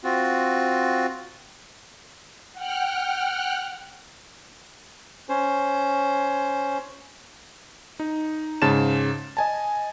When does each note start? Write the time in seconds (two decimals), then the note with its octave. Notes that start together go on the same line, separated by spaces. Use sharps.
0.04 C4 F4 F#4
2.53 F#5 G5 F6 F#6
5.29 C#4 C5
8.00 D#4
8.62 G#2 C#3 A5 A6 E7
9.37 D#5 G#5 A5